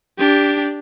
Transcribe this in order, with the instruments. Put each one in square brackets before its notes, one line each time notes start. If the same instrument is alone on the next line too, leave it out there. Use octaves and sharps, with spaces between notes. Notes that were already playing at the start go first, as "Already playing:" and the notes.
[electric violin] D4 G4